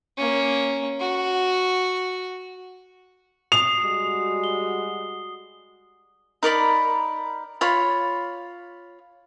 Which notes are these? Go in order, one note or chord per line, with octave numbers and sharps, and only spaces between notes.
A#3 C#4
F#4
D#6 C7 F7
G3 G#3 F#4
G7
D#4 A#4 D5 B5
F4 C#5 B5